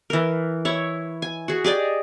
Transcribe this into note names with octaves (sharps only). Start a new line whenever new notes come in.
E3 A#4
E4 C#5
G#5
F#4 G#4
G4 G#4 D5 D#5